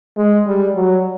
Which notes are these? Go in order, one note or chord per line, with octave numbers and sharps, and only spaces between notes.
G#3
G3
F#3